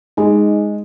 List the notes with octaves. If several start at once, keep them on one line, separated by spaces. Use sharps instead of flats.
G#3 D#4 G#4 D#5